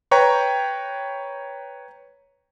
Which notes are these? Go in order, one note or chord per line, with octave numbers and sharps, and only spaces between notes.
B4 C#5 G5 A#5 C#6